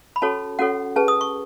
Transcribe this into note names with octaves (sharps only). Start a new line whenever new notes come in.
B5
C#4 F#4 A4 C#5 A5
C#4 F#4 A4 C#5 F#5
C#4 G#4 B4 A5
D#6
C#6